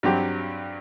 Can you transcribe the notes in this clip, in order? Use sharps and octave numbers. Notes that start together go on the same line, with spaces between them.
G2 F#3 C4 G4